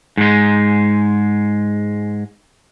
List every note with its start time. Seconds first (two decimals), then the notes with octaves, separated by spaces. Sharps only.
0.17 G#2 G#3